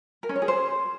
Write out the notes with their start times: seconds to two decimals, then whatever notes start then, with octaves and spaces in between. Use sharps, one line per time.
0.23 A#4
0.29 C#4
0.36 C#5
0.42 G#4
0.48 C5